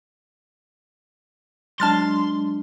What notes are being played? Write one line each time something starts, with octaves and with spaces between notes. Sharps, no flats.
F#3 G#3 D4 A5 C6 F6 A6